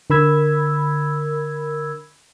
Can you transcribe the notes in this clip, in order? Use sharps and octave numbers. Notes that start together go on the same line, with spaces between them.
D3 A#4 B5 E6 G#6